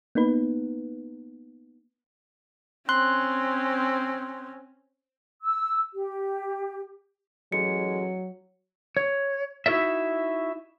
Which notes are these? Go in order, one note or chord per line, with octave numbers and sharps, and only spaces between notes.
A#3 B3 D#4 B4
C4 C#4 C6 F#6
E6
G4
A1 F#3 G#3 C#7
C#5
D#4 E4 F#4 A#4 D5 E5